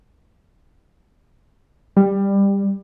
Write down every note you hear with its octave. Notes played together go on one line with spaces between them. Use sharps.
G3